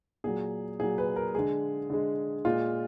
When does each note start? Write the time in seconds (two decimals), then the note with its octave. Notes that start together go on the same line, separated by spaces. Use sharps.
0.24 A#2 F#3 G#4
0.79 A#2 F#3 G#4
0.98 B4
1.16 A#4
1.35 D3 G#3 G#4
1.90 D3 G#3
2.45 A#2 G#3 F4